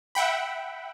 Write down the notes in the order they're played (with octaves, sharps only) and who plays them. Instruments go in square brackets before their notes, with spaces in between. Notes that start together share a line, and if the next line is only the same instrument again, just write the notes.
[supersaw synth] E5 F#5 G5 B5